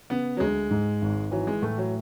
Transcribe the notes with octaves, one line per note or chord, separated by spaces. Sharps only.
C#3 B3
F#3
D2 G#3
G#2
G#1
E3 F#3
G#3
A2 A3
F#3